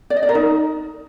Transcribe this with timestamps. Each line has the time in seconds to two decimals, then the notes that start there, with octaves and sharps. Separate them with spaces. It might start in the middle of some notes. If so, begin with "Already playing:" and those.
0.10 D5
0.17 D#5
0.23 D5
0.29 A#4
0.35 D#4